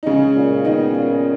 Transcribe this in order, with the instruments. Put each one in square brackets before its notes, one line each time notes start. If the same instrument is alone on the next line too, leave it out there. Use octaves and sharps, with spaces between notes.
[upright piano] D#4
[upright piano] C#3 C#4 [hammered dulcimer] G#3
[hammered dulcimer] A#2
[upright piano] D#3 D#4 [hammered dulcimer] B3
[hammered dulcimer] A#2